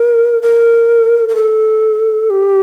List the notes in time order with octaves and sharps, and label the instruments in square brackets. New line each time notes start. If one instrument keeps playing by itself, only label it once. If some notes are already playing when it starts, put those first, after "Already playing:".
Already playing: [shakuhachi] A#4
A#4
A#4
A4
G4